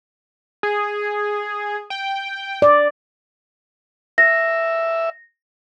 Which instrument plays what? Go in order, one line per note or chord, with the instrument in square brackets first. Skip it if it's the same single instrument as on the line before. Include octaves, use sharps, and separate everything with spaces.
[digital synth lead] G#4
G5
[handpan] D5
[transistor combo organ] E5 [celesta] A#6